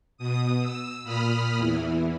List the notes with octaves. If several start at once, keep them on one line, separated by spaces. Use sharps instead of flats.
B2 D#6
E6
A#2 B5 D#6 F6
E2 E3